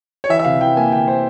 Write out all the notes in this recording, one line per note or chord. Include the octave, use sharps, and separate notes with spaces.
C#5
E3 E5
E5
C3 F5
E3 G5
A#3 G#5
C3 G5
A#3 C5